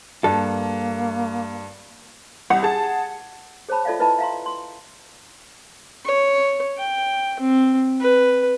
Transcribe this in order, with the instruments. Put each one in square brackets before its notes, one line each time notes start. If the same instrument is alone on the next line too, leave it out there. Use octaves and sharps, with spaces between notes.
[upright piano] G2 [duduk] A#3 [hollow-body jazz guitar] A4
[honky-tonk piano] C2 [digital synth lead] F#5
[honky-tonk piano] G#4 A5
[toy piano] G#4 C5 C#5 A5 B5
F4 A4 D5 E5 F5
E4 B4 D#5 E5 A5 B5
E5 F5 A#5 C6
C6
[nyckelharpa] C#5
G5
C4
B4